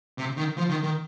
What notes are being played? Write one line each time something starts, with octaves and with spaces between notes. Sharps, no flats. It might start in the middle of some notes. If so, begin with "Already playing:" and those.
C3
D#3
F3
D#3
D#3